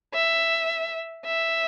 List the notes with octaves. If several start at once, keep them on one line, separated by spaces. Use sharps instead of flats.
E5
E5